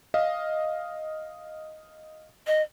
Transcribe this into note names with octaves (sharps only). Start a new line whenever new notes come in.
D#5 F5
D#5